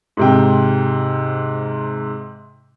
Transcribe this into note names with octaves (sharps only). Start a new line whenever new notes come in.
G#2 C3 G5